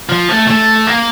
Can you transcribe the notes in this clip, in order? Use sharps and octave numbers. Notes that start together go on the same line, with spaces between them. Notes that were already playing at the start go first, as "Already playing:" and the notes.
F3
A3
A3
A#3